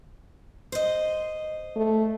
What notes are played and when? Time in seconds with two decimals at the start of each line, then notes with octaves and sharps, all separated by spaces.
0.72 C5 D#5
1.76 A3